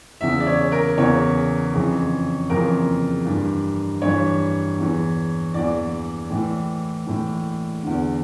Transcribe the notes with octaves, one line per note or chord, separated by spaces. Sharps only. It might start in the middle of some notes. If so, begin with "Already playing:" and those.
E2 C#3 E3 E5
D5
C#5
A#4
E2 C#3 E3 C#5
F2 C#3 E3
F2 C#3 E3 A#4
G2 E3
G2 E3 C#5
E2 E3
E2 E3 D5
A2 E3
A2 E3
E2 D3